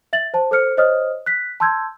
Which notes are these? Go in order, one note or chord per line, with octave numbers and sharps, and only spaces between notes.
E5 A6 F#7
C5 A5
A4 C5 F6 C#7
C5 C#5 D#5 D#6 F6
F#6 B6
A5 C6 E6 G6 G#6